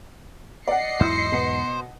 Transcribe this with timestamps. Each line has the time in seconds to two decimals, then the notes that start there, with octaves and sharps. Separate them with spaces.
0.68 D5 D#5 F#5 C7 C#7
1.00 E2 G#2 F#3 E4 C5
1.32 B2 B3